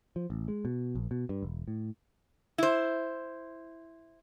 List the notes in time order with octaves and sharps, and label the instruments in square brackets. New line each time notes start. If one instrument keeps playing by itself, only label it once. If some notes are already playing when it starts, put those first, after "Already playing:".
[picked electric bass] F3
A1
G#3
B2
A#1
B2
G2
E1
A2
[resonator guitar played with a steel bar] E4 C5